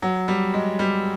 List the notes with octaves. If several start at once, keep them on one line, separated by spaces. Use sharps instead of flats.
F#3
G3
G#3
G3